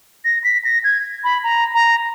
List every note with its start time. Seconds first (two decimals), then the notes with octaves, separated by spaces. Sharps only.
0.25 A#6
0.44 B6
0.65 A#6
0.84 G#6
1.24 B5
1.44 A#5
1.74 A#5